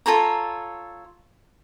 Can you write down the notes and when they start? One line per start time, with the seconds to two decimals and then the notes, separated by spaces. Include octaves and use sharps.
0.06 F4 A4 C#5 A#5